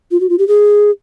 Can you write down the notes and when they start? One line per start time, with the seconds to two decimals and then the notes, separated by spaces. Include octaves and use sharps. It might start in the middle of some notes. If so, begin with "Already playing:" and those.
0.11 F4
0.20 F#4
0.30 F4
0.39 G4
0.48 G#4